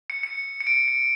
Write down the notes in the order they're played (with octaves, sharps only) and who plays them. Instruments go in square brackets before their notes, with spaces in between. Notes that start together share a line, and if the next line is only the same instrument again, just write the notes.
[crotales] C#7
C#7
C#7
D7
C#7